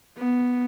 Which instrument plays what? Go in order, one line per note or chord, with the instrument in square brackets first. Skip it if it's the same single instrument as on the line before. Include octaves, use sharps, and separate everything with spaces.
[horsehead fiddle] B3